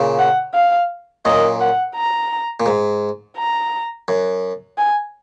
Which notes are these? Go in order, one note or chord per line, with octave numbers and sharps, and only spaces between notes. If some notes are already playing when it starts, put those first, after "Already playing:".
Already playing: A#2 C#3
F#5
F5
F#2 A#2 D#5
F#5
A#5
A#2
G#2
A#5
F#2
G#5